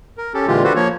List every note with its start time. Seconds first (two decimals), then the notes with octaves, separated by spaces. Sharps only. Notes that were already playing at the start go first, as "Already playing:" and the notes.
0.18 A#4
0.34 C#4 G4 A4
0.47 A#2 D3 E3 G#3 F4 G4
0.64 D4 F#4 G4 A4 B4 C5
0.75 F3 A#3 C#5